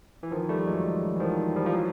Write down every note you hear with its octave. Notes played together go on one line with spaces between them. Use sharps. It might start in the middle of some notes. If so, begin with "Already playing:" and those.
E3
D#3 F3
G3 A3
F#3 G#3
E3
D#3 F3
F3 G3
F3
E3 F#3